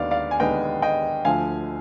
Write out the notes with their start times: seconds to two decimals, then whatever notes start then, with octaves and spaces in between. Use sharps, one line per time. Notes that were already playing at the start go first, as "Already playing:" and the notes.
Already playing: D#2 D3 G#3 B3 D#4 D5 F5
0.11 D5 F5
0.31 G#5
0.40 D#2 D3 G#3 B3 D#4 D#5 G5
0.82 D#5 G5
1.25 D2 D3 F3 F5 G#5